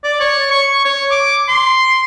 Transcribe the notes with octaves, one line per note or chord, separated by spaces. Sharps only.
D5
C#5
C#6
C#5
D6
C6